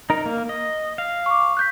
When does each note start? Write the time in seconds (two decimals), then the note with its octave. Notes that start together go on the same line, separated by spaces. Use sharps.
0.10 D#4 A#4
0.26 A#3
0.49 D#5
0.98 F5
1.26 C#6 D6
1.57 F#6 G6 B6